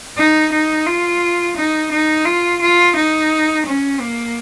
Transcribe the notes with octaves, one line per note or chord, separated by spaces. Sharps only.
D#4
D#4
F4
D#4
D#4
F4
F4
D#4
C#4
A#3